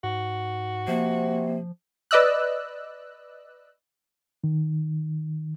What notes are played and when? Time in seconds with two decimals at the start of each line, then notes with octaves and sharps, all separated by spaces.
0.04 G#2 F#4
0.88 C3 F3 A#3
2.11 B4 D5 D#5 E6 F#6
4.44 D#3